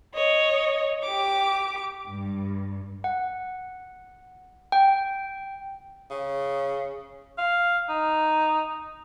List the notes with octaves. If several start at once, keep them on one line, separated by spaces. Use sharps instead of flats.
C#5 D#5
G4 D6
G2
F#5
G5
C#3
F5
D#4